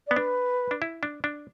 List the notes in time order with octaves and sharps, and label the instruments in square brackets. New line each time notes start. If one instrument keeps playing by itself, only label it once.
[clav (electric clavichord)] B3 [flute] D5
[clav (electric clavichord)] D4 [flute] B4
[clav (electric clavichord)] D4
E4
D4
D4